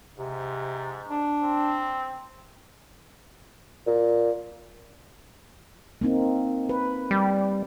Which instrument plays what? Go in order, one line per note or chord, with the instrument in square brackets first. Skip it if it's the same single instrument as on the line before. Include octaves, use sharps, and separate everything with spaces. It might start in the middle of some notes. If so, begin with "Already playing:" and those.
[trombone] G#2 [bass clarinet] C3
[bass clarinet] D4
[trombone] C4
[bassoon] A#2
[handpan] A#3 C4 D#4
B4
[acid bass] G3